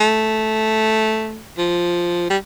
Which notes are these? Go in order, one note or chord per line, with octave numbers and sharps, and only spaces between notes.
A3
F3
G3